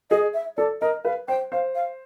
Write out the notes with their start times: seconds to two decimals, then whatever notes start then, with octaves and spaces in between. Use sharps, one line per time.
0.11 G#4 D#5
0.34 E5
0.57 A4 D5
0.81 A#4 D#5
1.05 B4 F5
1.28 C5 G5
1.52 C5 F5
1.75 F5